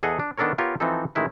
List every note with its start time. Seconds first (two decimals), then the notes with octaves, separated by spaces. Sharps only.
0.03 E2 G#4 A4 D#5 F#5
0.19 D4
0.38 D#3 B3 D4 A4 A#4 C#5
0.58 B3 F4 G4 A#4 C#5
0.80 E3 F3 C4 D#4 A4
1.15 A1 D#3 G#3 E4 B4